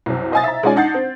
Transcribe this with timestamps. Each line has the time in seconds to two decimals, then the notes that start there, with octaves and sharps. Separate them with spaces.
0.06 C2 F#2 C3
0.32 C5 D#5 F5 G#5 D#6 A6
0.44 E5 A#5
0.63 G#3 C#4 D#4 F4 D5 G#5
0.76 D4 D#4 F#5 G6 A6 C7
0.94 C4